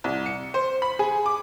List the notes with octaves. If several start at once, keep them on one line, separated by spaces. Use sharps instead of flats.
C2
C#7
C5
B5
G#4
D6